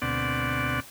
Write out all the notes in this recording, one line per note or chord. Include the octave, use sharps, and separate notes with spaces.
D2 B2 C4 D5 F#5